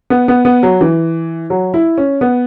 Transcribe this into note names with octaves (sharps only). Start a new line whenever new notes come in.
B3
B3
B3
F#3
E3
F#3
E4
C#4
B3